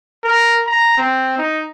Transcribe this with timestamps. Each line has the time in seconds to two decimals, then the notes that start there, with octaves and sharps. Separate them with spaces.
0.24 A#4
0.67 A#5
0.97 C4
1.38 D#4